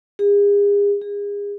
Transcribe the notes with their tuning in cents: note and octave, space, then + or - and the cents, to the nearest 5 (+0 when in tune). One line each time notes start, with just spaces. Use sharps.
G#4 -40
G#4 -35